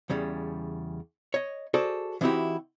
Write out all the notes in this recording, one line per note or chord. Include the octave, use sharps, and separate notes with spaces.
E2 C#3 G3
C#5 D#5
F#4 G#4 A4 C5 D5
E3 C4 D#4 E4 F#4 G4